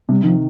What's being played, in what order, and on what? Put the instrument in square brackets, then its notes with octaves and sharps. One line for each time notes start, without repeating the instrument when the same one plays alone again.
[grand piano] C3 [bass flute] G3
[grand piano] D#3 [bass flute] F3